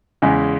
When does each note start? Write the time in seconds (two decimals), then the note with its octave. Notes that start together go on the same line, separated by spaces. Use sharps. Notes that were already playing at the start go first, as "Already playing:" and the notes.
0.22 E2 C#3 G#3